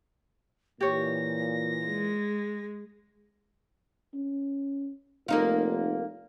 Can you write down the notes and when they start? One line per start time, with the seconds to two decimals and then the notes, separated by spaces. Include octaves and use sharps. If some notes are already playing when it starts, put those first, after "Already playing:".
0.81 A#2 E3 G4 C#5 A#6
1.86 G#3
4.14 C#4
5.28 F1 A#3 D#4 F4